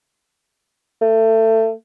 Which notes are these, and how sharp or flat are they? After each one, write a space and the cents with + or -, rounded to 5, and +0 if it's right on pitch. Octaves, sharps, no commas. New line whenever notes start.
A3 +25